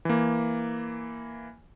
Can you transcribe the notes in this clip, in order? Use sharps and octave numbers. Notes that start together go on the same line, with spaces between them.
E3 A#3